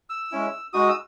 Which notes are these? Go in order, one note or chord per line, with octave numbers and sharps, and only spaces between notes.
E6
G#3 C#4 E4
G#3 D#4 F#4 D#6
E6